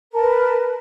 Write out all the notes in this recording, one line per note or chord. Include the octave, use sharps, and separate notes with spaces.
A#4 B4 A5